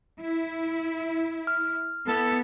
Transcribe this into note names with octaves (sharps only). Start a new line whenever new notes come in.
E4
F6
B3 E4 A4